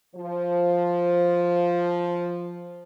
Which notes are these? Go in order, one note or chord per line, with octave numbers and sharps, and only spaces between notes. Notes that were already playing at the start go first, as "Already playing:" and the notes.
F3 C5